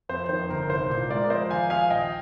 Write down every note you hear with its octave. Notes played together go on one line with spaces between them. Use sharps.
F2 C5
D#3 C5
G1 A#4
C2 C5
A#2
G#3 A#4 D5
F3 C5 D#5
D#2 F5 G#5
F3 F5 G#5
A#1 D#5 G5